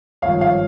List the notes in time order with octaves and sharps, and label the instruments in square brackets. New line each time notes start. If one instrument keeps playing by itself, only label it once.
[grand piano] G#1 G2 F3 C#5 F5
C#5 F5